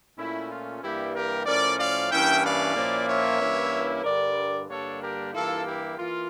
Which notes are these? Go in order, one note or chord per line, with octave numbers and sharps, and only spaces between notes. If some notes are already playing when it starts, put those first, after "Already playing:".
A#2 A3 C#4 E4
F4
G2 E3 G3 A#3 E4 G4
G4 A#4
A2 F3 C#4 A#4 D5
D5 F5
G2 E3 A#3 C#4 E4 E5 G5
D5 F5
A#2 F3 A#3 C#4 E4
C#5 E5
G2 E3 A#3 C#4 E4
G2 D3 G3 A#4 D5
G2 D3 G3 A#3 D4 A4 C#5
G4 A#4
G2 E3 A#3 E4 F4 A4
E4 G4
E3 A#3 F4